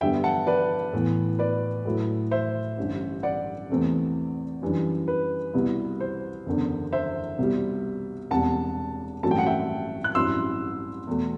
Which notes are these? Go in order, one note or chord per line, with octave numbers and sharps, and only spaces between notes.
G2 D3 G3 B3 E5 G5
F#5 A5
B4 D5
A2 E3 B3
B4 D5
A2 F#3 A3 E4
C5 E5
A1 G2 D3
D5 F#5
E2 C3 E3 A3 C4
F#2 E3 G3 D4
B4
C2 B2 G3 B3 E4
C5
F#1 E2 D3
C5 E5
C2 B2 G3
E1 E2 C3 G3 F#5 A5
A1 G2 F#3 A3 C4 A5
G5
F#5
E5 G5
F#6
A1 G2 F#3 C4 E4 C6 E6
E2 B2 A3